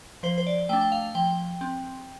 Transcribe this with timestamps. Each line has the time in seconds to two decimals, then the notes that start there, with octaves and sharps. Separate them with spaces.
0.23 F3 C5
0.38 C5
0.47 D5
0.69 A3 D4 G5
0.81 G5
0.92 F5
1.15 F3 G5
1.61 C4